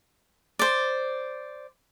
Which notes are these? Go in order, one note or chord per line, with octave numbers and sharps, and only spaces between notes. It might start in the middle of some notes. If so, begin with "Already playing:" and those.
C5 D5